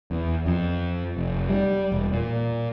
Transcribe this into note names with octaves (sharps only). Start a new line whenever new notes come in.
E2
F2
F1
G3
E1
A#2